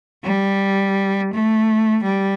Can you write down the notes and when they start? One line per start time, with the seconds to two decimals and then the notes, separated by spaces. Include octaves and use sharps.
0.23 G3
1.33 A3
2.04 G3